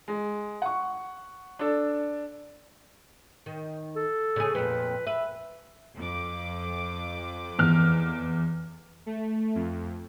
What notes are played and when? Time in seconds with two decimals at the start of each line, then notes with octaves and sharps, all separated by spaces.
0.08 G#3
0.62 F#5 C#6
1.59 D4 A4
3.46 D#3
3.96 A4
4.36 C#3 G#4
4.55 F2 A#2 B4
5.07 B4 E5
5.96 F2 D6
7.59 E2 F6
9.06 A3
9.55 F2